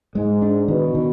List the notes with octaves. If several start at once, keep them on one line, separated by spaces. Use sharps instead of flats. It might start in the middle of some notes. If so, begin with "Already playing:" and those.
G#2 G#3
D4
B2 D#3
D#3